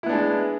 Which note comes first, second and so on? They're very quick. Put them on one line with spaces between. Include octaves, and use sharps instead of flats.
E4 B3 D4 G#3